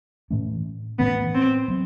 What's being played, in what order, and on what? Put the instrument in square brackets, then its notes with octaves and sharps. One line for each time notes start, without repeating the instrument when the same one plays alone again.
[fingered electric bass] A2 E3 A3 C#4
[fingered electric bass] A2 E3 A3 C#4 [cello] B3
[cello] C4
[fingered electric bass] F#3 B3